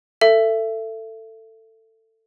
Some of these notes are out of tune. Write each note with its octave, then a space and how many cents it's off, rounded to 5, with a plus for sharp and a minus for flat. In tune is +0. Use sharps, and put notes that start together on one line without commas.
A4 +20 E5 +25